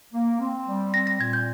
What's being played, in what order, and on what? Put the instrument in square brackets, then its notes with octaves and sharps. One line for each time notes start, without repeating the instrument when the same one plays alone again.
[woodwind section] A#3
C4
G3
[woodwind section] C4 [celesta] A#6
[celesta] A#6
[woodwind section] A#2 [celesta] G#6
[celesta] G6